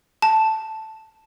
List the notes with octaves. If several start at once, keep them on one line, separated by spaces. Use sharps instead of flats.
A5